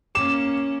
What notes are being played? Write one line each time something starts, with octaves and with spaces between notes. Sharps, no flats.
A#3 C#4 D6 E7